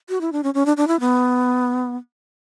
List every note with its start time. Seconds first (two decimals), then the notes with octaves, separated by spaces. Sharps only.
0.09 F#4
0.21 E4
0.32 D4
0.43 C#4
0.54 C#4
0.66 D4
0.77 D4
0.88 E4
1.00 B3